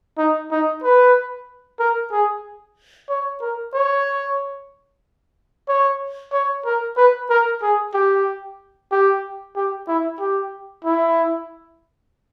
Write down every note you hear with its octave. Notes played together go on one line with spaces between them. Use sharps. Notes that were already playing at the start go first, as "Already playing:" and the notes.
D#4
D#4
B4
A#4
G#4
C#5
A#4
C#5
C#5
C#5
A#4
B4
A#4
G#4
G4
G4
G4
E4
G4
E4